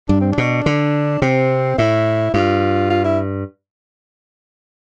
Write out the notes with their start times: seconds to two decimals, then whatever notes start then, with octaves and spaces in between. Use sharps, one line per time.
0.09 G2 D4
0.21 C4
0.32 D4
0.38 B2
0.66 D3
1.22 C3 C4
1.78 A2 E4
2.34 G2 F4
2.90 F4
3.04 E4